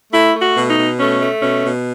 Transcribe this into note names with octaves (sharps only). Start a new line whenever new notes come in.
A3 E4
A3
F#4
B2
D#4
B2
A3 C#4
A3
B2 C#4
B2